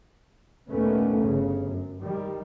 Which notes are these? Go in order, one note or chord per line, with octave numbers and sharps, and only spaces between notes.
D#2 A#2 A3 B3 C#4
G1 C#3
F#2
D#3 G3